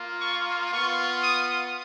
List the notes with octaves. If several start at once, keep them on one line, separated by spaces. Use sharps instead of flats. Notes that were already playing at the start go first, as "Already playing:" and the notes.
Already playing: A#3 F4
C#6
B3 F4 C#6
D#6